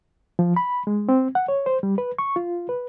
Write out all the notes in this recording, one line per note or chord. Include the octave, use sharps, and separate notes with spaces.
F3
B5
G#3
C4
F#5
C#5
C5
G3
B4
C#6
F4
B4